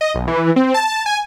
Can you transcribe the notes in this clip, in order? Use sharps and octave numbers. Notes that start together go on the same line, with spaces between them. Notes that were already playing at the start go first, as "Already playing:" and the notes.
D#5
B1
E3
C4
A5
G#5